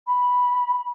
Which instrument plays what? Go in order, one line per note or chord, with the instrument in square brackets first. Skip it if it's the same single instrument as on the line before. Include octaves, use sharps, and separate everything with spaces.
[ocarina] B5